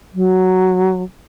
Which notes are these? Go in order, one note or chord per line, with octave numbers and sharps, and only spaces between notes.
F#3